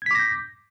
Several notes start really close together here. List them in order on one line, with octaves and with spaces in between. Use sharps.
G#6 B6 D6 A#6 G6